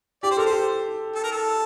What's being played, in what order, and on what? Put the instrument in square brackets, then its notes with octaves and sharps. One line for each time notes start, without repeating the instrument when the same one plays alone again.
[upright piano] G4 [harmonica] D5
[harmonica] C5
[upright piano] A4 [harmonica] A#4
[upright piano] G4 [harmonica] C5
[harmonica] A4
A#4
A4